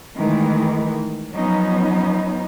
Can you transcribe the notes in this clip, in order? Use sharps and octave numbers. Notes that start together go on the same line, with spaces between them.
D#3 E3 G#3 A3
F3 F#3 B3 C#4 D#4